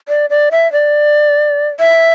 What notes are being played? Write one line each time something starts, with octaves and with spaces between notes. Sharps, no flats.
D5
D5
E5
D5
E5